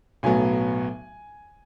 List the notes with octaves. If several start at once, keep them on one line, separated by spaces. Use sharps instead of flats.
B1 A2 F#3 B3 G#5